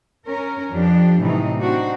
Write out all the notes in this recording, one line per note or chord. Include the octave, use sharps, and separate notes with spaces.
C#4 A#4
F2 F3 D4 G4
A2 C3 E3 F#3 A3 D#4
C4 D4 D#4 F#4